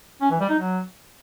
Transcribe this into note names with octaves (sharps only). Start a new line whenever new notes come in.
C#4
E3
G3
D#4
F#3